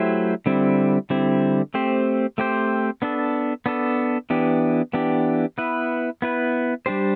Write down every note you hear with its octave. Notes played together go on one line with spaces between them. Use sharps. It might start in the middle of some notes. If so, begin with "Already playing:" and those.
Already playing: F#3 A3 E4 G4 C5
D3 G3 C4 E4
D3 G3 C4 E4
A3 C4 G4 C5
A3 C4 G4 C5
B3 D4 A4
B3 D4 A4
E3 B3 D4 G4
E3 B3 D4 G4
B3 E4 B4
B3 E4 B4
G3 D4 G4 C5